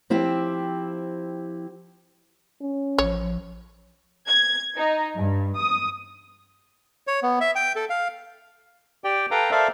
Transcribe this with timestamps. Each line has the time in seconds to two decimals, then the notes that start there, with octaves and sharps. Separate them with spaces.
0.10 F3 C4 E4 G4
2.61 C#4
2.98 A1 F3 C#5
4.27 G#6
4.77 D#4
5.16 G2
5.57 D#6
7.07 C#5
7.23 B3
7.41 E5
7.56 G5
7.76 A4
7.90 F5
9.04 G4 D5 G5
9.31 A4 B4 F5 G5 A#5
9.51 A4 A#4 C5 D5 E5 F5